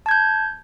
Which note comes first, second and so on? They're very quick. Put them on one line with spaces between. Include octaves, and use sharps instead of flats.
A5 G#6 G6